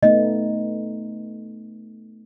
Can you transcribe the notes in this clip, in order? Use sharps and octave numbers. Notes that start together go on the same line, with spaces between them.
A3 B3 D#4 D#5